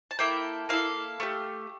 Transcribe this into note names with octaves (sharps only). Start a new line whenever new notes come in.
A5
A#3 E4 A4 G5
A#3 E4 A4 F5
A3 D4 G4